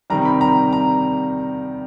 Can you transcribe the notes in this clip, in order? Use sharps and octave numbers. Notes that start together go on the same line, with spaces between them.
C3 D#3 G3 A#5
B5
A#5
A#5